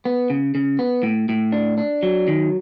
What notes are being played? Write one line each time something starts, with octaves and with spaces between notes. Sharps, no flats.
B3
C#3
C#3
B3
A2
A2
D4
D4
F#3
D#3